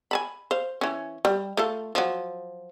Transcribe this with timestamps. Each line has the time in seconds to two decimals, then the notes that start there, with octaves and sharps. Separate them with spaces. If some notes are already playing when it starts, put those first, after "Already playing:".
0.11 G#5 A5 B5
0.51 C5 F5
0.81 E3 C#4
1.25 G3
1.57 A3 F4 A4
1.95 F3 F#3